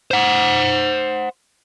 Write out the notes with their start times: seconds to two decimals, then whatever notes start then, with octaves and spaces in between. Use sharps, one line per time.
0.11 C5 F#5